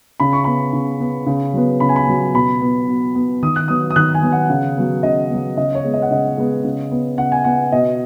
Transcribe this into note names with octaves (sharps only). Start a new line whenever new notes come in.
C#3 B5
C#6
B3 B5
C#3
B3
C#3
F#3 B3
C#3 B5
G#5
B5
F#3 B3
B2 B5
B3
B2
B3
D#3 D#6
F#6
F#3 B3 D#6
D#6
D#3 F#6
G#5
F#3 B3
F#5
C#3
F#3 B3
C#3 D#5
F#3 B3
C#3 D#5
C#5
G#3 B3
D#5
F#5
C#3 D#5
G#3 B3
C#3
B3
C#3 F#5
G#5
B3 F#5
B2 D#5